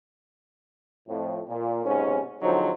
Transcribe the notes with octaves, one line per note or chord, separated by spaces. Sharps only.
F2 A2
A#2
B1 G#2 C3 C#4
G#2 D3 F3 F#3 C4 D#4